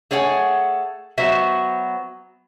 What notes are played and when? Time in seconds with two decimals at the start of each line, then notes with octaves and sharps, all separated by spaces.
0.11 A3 G#4 C#5 F#5 G#5
1.18 F#3 B3 F#4 C5 E5